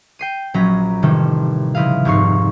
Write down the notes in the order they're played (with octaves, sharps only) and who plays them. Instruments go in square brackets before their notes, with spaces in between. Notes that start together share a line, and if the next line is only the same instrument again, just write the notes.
[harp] G5 C7 D#7
A#1 F#3 C#4 A#5 B6
A1 C3 D#3 G3 A4
C#3 F3 E4 D#5 F5
F1 C2 G#2 D#4 C#6 C7